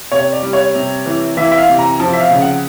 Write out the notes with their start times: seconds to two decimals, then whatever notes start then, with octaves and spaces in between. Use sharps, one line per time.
0.12 C3 C#5
0.33 D5
0.43 G3
0.53 C#5
0.75 C3
1.06 E3
1.37 E3 E5
1.52 E5
1.58 F5
1.68 C3
1.79 A#5
2.00 F3 A5
2.13 E5
2.20 F5
2.31 C#3
2.41 F#5